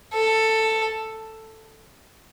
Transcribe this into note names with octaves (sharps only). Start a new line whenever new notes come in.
A4